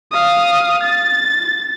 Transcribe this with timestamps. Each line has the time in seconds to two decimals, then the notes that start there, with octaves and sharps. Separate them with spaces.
0.12 F5 D#6
0.83 A6